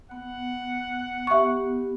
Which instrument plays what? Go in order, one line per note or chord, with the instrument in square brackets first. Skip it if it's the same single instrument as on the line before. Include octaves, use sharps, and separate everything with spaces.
[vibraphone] B3 [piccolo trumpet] F#5
[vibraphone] B3 G4 [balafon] E5 C#6